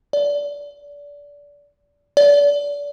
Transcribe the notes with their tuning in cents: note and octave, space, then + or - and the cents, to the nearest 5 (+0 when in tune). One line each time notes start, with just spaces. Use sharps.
D5 -25
D5 -30